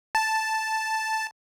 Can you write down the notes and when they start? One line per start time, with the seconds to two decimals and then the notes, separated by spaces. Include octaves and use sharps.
0.15 A5